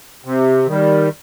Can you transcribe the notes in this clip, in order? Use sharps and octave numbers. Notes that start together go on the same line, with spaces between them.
C3
D#3 G3